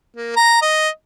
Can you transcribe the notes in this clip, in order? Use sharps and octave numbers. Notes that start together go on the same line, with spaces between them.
A#3
A#5
D#5